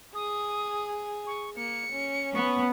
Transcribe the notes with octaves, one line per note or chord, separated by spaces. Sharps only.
G#4 D#6
C#6
A#3 C#7
C#4
B3 C#6